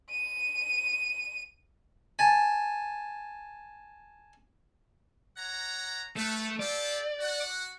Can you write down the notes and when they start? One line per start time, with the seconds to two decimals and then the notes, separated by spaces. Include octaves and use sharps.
0.11 D#7
2.19 G#5 A5
5.37 C#5 F#5 A#5
6.16 A3 A4 B4
6.60 F4 G4 A4 D5
7.19 F#4 F#5